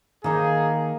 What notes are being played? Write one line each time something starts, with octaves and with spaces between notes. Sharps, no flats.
D#3 A#3 D#4 G#4 A#4